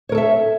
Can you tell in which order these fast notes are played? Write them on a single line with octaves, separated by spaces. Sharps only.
C#5 A#4 A4 E5